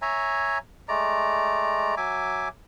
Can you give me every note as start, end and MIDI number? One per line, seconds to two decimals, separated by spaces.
0.02 0.58 73
0.02 0.58 76
0.02 0.58 80
0.02 0.58 82
0.88 1.95 56
0.88 1.95 57
0.88 1.95 74
0.88 1.95 82
1.97 2.48 54
1.97 2.48 76
1.97 2.48 80
1.97 2.48 86